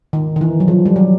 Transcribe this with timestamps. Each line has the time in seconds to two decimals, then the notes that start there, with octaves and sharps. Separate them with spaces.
0.13 D#3
0.36 D#3
0.41 E3
0.60 F#3
0.68 F3
0.86 G3
0.96 F#3